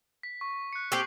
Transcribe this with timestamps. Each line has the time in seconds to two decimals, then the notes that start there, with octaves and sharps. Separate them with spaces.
0.23 B6
0.41 C#6
0.73 F#6 C#7
0.92 C4 G4 A4 C#6 C7 F#7